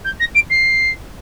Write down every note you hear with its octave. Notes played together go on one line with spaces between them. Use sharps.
G6
A#6
D7
C7